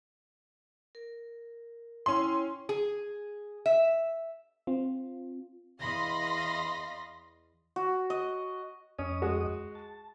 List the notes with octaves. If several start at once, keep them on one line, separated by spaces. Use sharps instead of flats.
A#4
C#4 E4 C#5 G5 C6
G#4
E5
C4 F4
E2 D#5 F5 B5 C6 A#6
F#4
D#5
F2 C#4 C#5 D#5 D#6
G#3 F#4
A5